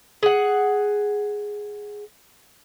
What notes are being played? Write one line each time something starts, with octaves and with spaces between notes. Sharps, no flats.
G#4 F#5